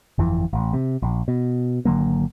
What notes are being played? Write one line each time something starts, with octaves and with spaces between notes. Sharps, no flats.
G1 F2 E3
A1
C3
A#1
B2
G#1 D3 F#3 A#3